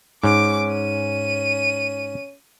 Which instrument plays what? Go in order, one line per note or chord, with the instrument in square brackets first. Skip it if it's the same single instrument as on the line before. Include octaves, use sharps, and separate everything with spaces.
[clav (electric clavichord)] G#2 [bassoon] C#4 [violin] D6
[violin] D#7